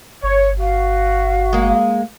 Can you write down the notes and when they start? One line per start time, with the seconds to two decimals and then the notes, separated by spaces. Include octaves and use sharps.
0.24 G1 C#5
0.60 F#4 F5
1.53 G#3 A#3